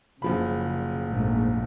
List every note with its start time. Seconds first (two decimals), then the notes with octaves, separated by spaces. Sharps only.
0.22 F#1 C#3 F3 B5
1.06 A#1 G#2 A3